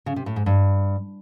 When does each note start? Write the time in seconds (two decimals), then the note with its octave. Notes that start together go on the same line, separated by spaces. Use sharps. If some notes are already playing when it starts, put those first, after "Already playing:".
0.06 C#3
0.16 C3
0.26 A2
0.36 G#2
0.46 G2